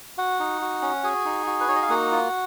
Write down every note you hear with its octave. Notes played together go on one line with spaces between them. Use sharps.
F#4 F#5
D#4
F#4
C#4
F#4 G#4 G#5
D#4
F#4
B4
D#4 C#5
D#5
F5
A#3 F#4 F#5
F4